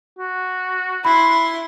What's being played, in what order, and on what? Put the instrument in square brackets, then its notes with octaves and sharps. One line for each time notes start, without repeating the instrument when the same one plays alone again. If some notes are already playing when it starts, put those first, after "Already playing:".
[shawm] F#4
[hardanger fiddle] E4 C6 [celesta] B5